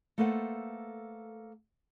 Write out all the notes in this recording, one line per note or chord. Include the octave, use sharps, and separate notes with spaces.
A3 A#3 A4 B4 C5 F#5